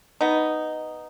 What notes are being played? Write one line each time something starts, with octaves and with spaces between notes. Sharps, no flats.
B3 D#4